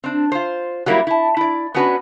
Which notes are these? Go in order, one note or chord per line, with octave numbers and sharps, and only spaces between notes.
C4 D4
F4 C5
F#3 G3 A#3 D#4 E4
E4 A5
E4 D5
B3 C#4 D4 F#4 B4